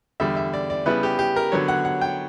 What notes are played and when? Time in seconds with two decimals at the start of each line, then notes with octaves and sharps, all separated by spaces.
0.20 E2 D3 G3 E5
0.36 E5
0.53 D5
0.70 D5
0.86 C#3 G3 B3 E4 B4
1.03 G4
1.19 G4
1.36 A#4
1.52 D3 F#3 B3 C#5
1.68 F#5
1.85 F#5
2.01 G5